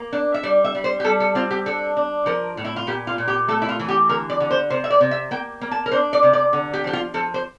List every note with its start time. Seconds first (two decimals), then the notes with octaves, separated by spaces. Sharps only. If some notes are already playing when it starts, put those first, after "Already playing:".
Already playing: A#3
0.12 D4
0.34 E5
0.43 G3 D5
0.64 E5
0.75 G3
0.84 C5
1.00 G4
1.04 G3 A4
1.20 A4
1.35 C4 F4
1.51 G4
1.66 D4 A4
1.97 D4
2.26 F3 A#4
2.57 A2
2.64 E4
2.76 F4
2.87 A#2 G4
3.07 F4
3.18 A#2
3.28 G4
3.48 A3 A4
3.62 E4
3.69 F4
3.79 E3
3.88 G4
4.09 D3 A#4
4.30 D5
4.40 D3
4.51 C5
4.70 C3 C5
4.84 E5
4.90 D5
5.01 C3
5.11 E5
5.31 A#3 G5
5.61 A#3
5.71 A5
5.86 A#4
5.91 D4 C5
6.13 D5
6.23 C3
6.33 D5
6.53 D3
6.73 G4
6.84 F3 G4
6.93 F4
7.14 F3 A4
7.34 C5